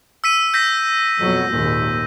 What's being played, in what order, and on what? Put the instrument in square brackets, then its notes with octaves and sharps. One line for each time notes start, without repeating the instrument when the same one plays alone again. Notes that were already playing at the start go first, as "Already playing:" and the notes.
[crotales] E6 B6 D#7
G6 A#6 B6
[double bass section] F2 B2 F#3
G#1 D#2 A#2